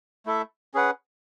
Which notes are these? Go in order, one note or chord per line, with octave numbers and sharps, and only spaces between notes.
A3 E4 A4 E5
C#4 G#4 B4 F#5